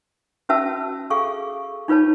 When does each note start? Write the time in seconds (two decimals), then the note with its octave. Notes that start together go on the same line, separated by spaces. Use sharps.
0.49 C#4 F#4 B4 E5 A5 E6
1.10 G#4 A4 F5 C#6
1.88 D#4 F4 B4 C#5 A5